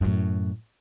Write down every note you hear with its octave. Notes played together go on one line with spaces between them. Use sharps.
F#2 A2